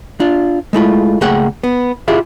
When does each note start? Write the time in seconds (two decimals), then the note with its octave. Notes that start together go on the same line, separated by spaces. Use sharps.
0.20 D4 F4
0.73 G#3 A3 E4 F4
1.21 C#2 A3 A#3 G#4 F#5 G5
1.64 B3
2.08 E4 F4 G4 G#4 E5 F5